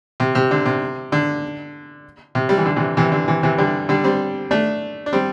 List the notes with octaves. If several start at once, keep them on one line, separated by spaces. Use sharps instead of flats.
C3
C3
D3
C3
D3
C3
G3
E3
D3
C3 E3
C3 E3
D3
C3 E3
C3 E3
D3 G3
D3 G3
G3 C4
A3 D4
D4
G3 C4